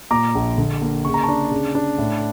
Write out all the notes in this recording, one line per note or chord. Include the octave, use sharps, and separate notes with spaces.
A#2 A#5 D6
A#1
D3
A#3
C#3 C#6
A#5
A5 C#6
D4
C#3
D4
A2